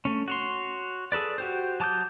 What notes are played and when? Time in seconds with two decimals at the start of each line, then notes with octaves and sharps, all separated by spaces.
0.05 A3 C#4
0.28 F#4 C#5 C6
1.12 G#4 A4 B4 D5
1.38 F#4 G4 C5
1.80 F#3 A5 D6 D#6 G6